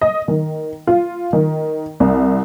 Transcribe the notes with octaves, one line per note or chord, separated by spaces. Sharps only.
D#5
D#3
F4
D#3
C2